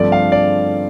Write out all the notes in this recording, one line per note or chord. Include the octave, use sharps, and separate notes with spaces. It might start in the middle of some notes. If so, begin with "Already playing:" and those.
Already playing: G2 D3 F3 A3 C4 D5
F5
D5